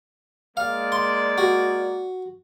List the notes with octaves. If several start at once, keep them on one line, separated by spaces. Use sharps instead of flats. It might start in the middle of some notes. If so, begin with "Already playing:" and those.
G#3 A#3 D5 F5
C6
F#4